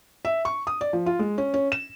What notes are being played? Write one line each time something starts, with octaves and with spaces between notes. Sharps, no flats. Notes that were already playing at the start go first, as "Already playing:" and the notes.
E5
C#6
D#6
D5
F3
F4
G#3
C#4
C#4
E7